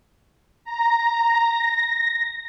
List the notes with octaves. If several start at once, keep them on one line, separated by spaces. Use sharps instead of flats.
A#5
A#6